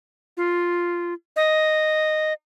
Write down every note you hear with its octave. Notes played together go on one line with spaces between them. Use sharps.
F4
D#5